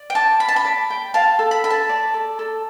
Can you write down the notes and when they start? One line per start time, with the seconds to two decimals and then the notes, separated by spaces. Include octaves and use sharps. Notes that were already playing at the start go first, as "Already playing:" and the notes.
Already playing: D5
0.10 G5
0.15 A5 D6
0.40 B5 D6
0.48 A5
0.56 B5
0.65 D5
0.90 G5
1.14 F5 A5
1.39 A4
1.51 B5
1.64 A4 B5
1.70 A5
1.89 D5
2.14 A4
2.39 A4